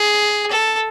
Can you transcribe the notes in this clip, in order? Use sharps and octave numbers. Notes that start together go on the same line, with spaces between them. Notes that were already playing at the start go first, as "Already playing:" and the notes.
Already playing: G#4
A4